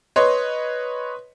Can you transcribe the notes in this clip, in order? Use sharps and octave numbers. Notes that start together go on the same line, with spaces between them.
B4 C#5 D#5 C6